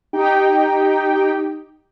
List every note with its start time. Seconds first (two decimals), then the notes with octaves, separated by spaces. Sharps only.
0.13 D#4 G4 G5